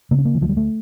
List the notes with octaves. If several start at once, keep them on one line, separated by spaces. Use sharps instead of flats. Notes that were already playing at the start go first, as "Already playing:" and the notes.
C#3 A#3
C#4
A#3
E3
D2 F3
G3
A3